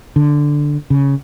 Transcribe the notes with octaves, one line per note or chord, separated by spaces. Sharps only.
D3
C#3